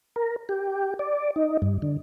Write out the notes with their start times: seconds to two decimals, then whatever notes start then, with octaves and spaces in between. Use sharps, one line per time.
0.16 A#4
0.49 G4
0.99 D5
1.36 D#4
1.62 G2
1.82 D3